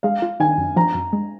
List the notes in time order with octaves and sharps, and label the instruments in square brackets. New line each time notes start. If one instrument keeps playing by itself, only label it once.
[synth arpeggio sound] G#3 [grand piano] F5
[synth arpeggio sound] F4
[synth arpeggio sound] D#3 [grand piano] G#5
[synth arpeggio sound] F#2
[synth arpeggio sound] F3 [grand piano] A#5
[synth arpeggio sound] F#2
G#3